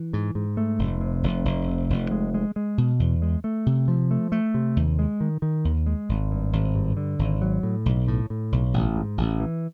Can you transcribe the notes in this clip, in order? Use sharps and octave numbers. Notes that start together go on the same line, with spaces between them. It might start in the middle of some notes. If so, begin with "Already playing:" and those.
Already playing: E3
G#2
G#2
A3
F1
C3
F1
F1
C3
F1
G#3
G#3
G#3
B2
E2
G#3
A3
C3
F3
A3
A3
C3
D#2
G#3
D#3
D#3
D#2
G#3
G#1
G2
G#1
G2
D3
G#1
F#3
A2
B1
A2
A2
B1
A1
G#2
A1
E3